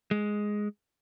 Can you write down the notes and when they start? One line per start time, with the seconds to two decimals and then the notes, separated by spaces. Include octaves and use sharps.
0.11 G#3